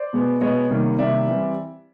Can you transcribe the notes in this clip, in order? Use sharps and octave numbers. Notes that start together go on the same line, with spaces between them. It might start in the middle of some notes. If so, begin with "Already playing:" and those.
Already playing: C5 D5
B2 G#3 B3
B2 G#3 B3 C#5 D#5
C3 D#3 G3 A#3
C3 D#3 G3 A#3 D5 E5
E3 G3 C4